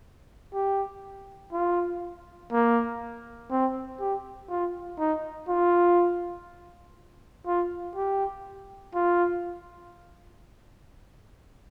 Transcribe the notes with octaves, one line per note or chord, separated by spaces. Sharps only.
G4
F4
A#3
C4
G4
F4
D#4
F4
F4
G4
F4